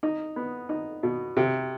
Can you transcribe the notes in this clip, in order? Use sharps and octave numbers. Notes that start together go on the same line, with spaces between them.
D#4
B3
D#4
B2
C3